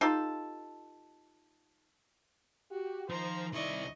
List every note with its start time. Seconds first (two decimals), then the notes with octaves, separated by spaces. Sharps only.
0.01 D#4 F4 G4 A4
2.72 F#4 G4
3.10 D#3 F3 C5 A#5
3.53 C2 E4 D5 D#5 C#6